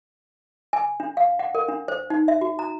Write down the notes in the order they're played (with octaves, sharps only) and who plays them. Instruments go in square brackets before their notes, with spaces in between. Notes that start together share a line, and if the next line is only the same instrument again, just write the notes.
[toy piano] G#5
D4
F5
F#5
A#4
D4
C5
D#4
E5
F#4
A#5